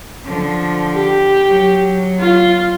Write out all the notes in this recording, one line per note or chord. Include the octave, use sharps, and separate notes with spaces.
D3 F3
G4
F#3
F4